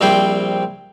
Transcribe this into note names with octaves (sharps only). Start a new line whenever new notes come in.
A#1 G3 C4 E4 C5 G5